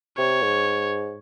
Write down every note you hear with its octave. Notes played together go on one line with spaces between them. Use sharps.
C3 C#5
G#2